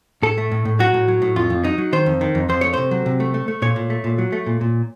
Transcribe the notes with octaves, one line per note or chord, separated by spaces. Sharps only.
A2 A4
A3
A2
A2
F#3 F#4
A2
F#3
A2
F2 F4
F2
F#3 D#4
F#3
D#3 C5
F2
D#3
F2
F2 C5
A3 C#5
C3 C5
F#3
C3
A3
A3
A3
A#2 C#5
A#2
A3
A#2
F#3
A3
A#2
A#2